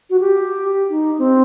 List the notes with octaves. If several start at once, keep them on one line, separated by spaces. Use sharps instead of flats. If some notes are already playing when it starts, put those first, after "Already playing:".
F#4
G4
D#4
C4